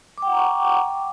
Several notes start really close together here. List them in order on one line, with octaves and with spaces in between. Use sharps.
D6 G5 F#5 A#5 C#6